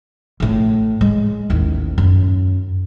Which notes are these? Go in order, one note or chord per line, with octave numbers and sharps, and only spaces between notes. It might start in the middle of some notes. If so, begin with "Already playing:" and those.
A1 A2
G#3
A1 D#2
F#2